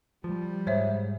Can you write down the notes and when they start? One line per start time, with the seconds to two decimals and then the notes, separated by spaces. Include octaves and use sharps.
0.24 F3 G3
0.67 G#2 C5 C#5 E5